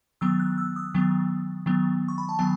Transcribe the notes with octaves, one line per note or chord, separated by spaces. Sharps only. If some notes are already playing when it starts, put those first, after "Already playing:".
D#3 F#3 B3 E6
F#6
E6
D#6
D#3 F#3 B3
D#3 F#3 B3
C#6
B5
A5
D#3 F#3 B3 G#5